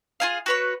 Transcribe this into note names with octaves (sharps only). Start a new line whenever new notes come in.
F4 G#4 F5
F#4 B4 C#5